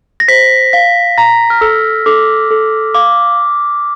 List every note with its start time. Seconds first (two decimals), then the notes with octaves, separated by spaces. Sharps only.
0.20 A#6
0.28 C5 B6
0.73 F5 B6
1.18 A#5 A#6
1.50 F6
1.61 A4 E6
2.06 A4 D6
2.50 A4
2.94 F5 D6